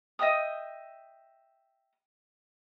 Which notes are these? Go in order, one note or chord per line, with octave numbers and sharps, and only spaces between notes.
D#5 E5 G5 D#6